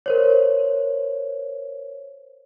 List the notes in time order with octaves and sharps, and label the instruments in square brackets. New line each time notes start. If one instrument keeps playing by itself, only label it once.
[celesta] A#4 C5 C#5